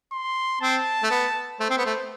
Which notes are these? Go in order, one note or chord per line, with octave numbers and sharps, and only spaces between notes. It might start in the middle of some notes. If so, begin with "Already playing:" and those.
C6
C4 A5
A3
B3
A3 C5
C4
B3
A3